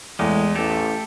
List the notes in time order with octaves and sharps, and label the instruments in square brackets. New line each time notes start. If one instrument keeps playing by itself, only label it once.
[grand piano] E2 [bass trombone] A2 [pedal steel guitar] G#3
[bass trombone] A1 [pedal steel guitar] A3 G4 A4